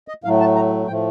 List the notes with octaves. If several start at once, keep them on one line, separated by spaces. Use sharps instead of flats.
D#5
A2 F#3 A3 F5
A5
A#5
A2 F3 A3 G5